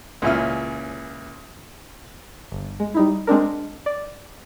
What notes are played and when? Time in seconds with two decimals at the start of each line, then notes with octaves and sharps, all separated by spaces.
0.22 C#2 A#2 C#4 E4 F6
2.52 G1
2.80 G#3
2.94 G3 D#4 E4
3.27 G#3 C4 D4 A#4
3.86 D5